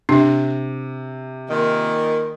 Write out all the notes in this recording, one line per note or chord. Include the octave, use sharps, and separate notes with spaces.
C3 D4
A#2 D#3